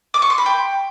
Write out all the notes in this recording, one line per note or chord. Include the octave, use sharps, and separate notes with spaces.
D6
C#6
C6
B5
G5